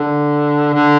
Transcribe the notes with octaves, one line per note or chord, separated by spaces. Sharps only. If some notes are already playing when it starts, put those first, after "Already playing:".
Already playing: D3
D3